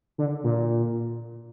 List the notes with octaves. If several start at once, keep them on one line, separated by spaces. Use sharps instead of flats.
D3
A#2